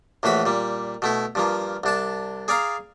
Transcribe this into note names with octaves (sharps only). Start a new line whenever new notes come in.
A#1 A2 E3 F#4 B5
A#2 G3
B2 A3 E4
G2 F3 A#3
C2 D4 A5
G#4 D5 F5 A#5